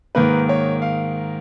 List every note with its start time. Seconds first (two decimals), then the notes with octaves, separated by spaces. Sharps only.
0.15 G#2 D#3 A#3 B4
0.49 C#5
0.82 F5